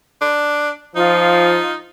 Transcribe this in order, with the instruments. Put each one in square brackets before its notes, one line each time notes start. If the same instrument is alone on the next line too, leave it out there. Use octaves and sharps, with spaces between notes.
[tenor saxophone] D4
[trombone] F3 [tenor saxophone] D#4 [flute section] F4